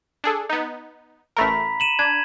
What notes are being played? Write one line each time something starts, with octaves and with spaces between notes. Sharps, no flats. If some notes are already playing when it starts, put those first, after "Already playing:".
D4 G#4 A4
B3 D#4
A1 A3 A#4 A#5 B5 B6
D#7 E7 F#7
D4 G#6